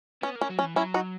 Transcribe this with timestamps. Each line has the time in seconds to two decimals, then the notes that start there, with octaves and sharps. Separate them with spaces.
0.23 B3 C#4
0.36 A#3
0.41 C#4
0.50 F#3
0.59 C#4
0.63 E3
0.76 F#3 C#4 E4
0.94 D#4 F#4